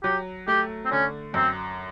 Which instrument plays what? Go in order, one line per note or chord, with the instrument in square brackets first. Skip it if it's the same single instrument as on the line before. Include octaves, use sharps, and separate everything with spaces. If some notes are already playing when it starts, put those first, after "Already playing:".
[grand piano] F#3 [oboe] G4
[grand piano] A3 [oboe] G4
[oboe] C4
[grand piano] D3 [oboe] C#4
[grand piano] F#2 [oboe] C4